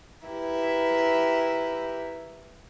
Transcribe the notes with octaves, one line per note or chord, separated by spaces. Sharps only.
E4 G4 A#4 B4 E5